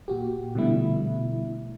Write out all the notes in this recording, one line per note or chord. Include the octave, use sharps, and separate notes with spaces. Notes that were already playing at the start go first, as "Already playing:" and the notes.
A#2 F#4 G4
B2 D3 F3 G3 A3 E4